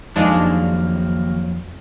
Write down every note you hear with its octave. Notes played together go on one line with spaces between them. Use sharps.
F2 D#3 F#3 G#3 A#3 D4 D#4 F5